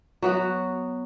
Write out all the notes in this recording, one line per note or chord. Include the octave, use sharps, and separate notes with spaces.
F#3 B3 F#4